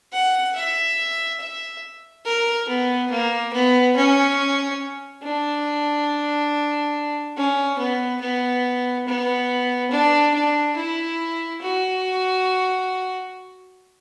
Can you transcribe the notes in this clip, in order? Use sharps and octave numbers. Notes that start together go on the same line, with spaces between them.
F#5
E5
E5
A#4
B3
A#3
B3
C#4
D4
C#4
B3
B3
B3
D4
D4
E4
F#4